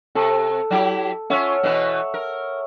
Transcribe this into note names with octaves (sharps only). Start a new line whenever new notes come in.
C3 A4
F#3 E4 G4
C#4 F4 C#5 E5 F#5
B2 E3 B4
A#4